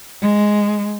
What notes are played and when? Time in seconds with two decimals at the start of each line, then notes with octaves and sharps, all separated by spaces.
0.21 G#3